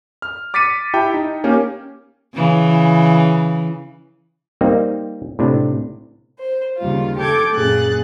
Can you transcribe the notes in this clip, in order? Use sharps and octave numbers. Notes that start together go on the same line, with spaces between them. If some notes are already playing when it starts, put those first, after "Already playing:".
F6
D6 A6 B6 C#7 D#7
E4 G4 G5 A5
D#4
A#3 C#4 G4
C#3 E3
G3 A#3 C4 D#4
A2 C3 D4
C5
D#2 C#3 G3 F4
G4 A4 D6 G6 G#6
F#2 A#2 C#4 G#4 F#6 A6